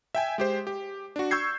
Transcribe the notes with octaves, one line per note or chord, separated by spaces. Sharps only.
E5 G5 G#5
G#3 G4 C5
G4
D4 F#4
C#6 E6 G6 G#6 C7